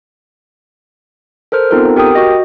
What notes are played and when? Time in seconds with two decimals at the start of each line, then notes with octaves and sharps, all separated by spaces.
1.52 A4 A#4 C5 F6
1.71 B3 C4 D#4 F4 A4 A#4
1.96 G4 A#4 G5 D#6
2.15 F#4 D#5